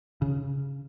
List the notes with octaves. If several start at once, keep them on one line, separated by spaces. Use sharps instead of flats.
C#3